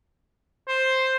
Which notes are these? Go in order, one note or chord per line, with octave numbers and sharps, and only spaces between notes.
C5